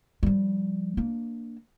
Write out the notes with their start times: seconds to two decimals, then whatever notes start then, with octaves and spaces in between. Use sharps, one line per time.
0.23 F3 G3
0.97 A#3 D4